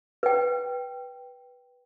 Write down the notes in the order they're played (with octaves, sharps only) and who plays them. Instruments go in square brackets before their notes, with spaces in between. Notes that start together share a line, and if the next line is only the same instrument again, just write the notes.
[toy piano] B4 G5